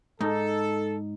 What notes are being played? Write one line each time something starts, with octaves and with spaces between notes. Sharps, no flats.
G#2 D#4 A4